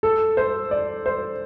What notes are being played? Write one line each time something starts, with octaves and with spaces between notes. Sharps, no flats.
A4
C5
D5
C5